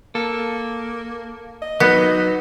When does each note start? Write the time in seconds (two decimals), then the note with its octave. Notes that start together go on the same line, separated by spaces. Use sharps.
0.15 A#3 A4
1.62 D#5
1.80 F#3 B3 D#4